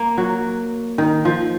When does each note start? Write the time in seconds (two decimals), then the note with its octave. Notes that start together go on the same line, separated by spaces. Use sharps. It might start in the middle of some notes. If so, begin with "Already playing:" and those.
Already playing: A#3
0.18 F#3
0.98 D#3
1.25 F3